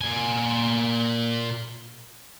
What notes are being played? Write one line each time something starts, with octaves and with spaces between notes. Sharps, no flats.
A#2 G#5